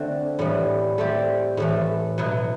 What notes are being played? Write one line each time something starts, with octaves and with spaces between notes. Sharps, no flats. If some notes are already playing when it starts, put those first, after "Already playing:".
Already playing: D3 A3 C4 F#4
A2 E3 G3 B3
A3 C4 G4 D5
A2 E3 A3
B2 F#3 B3 E4